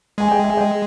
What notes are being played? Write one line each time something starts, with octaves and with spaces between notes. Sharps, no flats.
G#3 G#5
D#5 G5
E5 G#5
D#5 G5